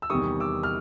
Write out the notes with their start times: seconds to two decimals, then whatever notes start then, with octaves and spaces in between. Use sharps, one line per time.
0.02 E6
0.10 E2 C3 D#3 G3 C#6 D#6
0.40 D6 E6
0.63 F6